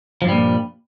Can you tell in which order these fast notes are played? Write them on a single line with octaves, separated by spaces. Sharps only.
F3 G2 G3 A#2